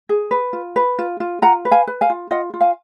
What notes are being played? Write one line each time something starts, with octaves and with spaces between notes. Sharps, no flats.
G#4
B4
F4
B4
F4
F4
F4 F#5 A#5
B4
F5 G#5
B4
F5 G#5
F4
F4 D#5 F#5
F4
F5 G#5